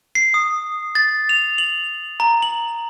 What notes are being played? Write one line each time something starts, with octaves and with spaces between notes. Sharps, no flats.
C7
D#6
A6
F7
F#7
A#5
F#7